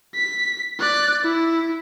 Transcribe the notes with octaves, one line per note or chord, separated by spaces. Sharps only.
B6
D5 F#6
E4